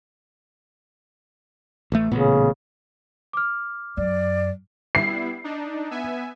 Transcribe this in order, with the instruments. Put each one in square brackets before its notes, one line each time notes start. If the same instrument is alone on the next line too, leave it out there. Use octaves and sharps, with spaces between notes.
[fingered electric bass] A1 A3
[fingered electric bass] A1 A#2 B3 [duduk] C#3
[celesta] D6 F6
[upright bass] F#2 [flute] D5
[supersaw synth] G3 B3 E4 [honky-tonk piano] C7
[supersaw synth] D4 D#4
B3 E5 G#5